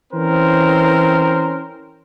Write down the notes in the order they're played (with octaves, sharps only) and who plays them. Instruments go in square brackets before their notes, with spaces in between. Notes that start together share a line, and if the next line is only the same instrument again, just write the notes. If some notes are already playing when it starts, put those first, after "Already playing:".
[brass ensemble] E3 C4 C#4 A#4 C5